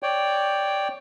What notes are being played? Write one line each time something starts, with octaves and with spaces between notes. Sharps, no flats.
C#5 D5 G5